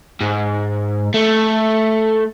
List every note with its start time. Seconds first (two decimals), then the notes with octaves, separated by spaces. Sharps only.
0.21 G#2
1.14 A3